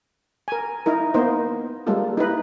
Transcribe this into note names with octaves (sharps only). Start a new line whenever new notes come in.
A#4 G#5
D#4 E4 A#4
A#3 B3 D#4 C5
G3 G#3 A#3 F4 A4
D#4 E4 B4